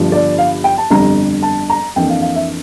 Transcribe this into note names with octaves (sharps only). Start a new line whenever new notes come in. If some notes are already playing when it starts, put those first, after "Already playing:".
Already playing: G1 G2 D3 F3
D5
F5
G5
A5
G1 F2 D3 G3 D4 A#5
A5
A#5
F2 E3 A#3 D4 G5
F5
F5
E5